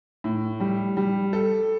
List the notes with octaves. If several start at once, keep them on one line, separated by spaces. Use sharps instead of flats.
A2
G3
G3
A4